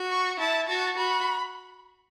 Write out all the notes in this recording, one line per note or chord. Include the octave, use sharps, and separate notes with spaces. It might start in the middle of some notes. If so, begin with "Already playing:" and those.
Already playing: F#4
C#6
E4 A5
F#4 A5
F#4 B5